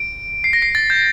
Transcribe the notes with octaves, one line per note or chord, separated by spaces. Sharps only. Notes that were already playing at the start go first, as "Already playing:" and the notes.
Already playing: D7
C7
A#6
C7
A6
G6